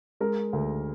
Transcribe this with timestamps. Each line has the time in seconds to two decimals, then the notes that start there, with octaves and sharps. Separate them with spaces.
0.20 G#3 A#4
0.53 D2